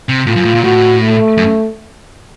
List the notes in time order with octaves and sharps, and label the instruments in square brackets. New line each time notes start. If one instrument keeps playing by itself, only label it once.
[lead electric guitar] C3
[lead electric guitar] A2 [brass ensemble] F4
[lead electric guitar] F#2
A2
A#2
[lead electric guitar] A2 [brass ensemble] F#4
[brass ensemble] A3
[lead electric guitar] F#2